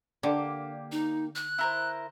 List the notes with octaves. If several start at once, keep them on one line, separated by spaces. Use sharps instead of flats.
D3 A#3 G4
D#4
F#6
E4 A#4 C5